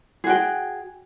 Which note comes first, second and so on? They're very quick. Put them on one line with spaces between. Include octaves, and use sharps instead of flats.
G#4 F#4 G5